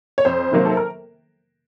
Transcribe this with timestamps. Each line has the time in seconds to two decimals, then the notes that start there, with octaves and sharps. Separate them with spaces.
0.18 C#5
0.25 F2 C5
0.51 C3 D#3 F#3 A#3
0.65 A4
0.77 A#4